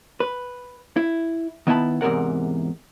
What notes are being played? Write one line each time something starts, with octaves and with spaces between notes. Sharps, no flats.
B4
E4
D#3 B3 E4 E5 A5 B5
E2 G#2 C3 A#4 F#5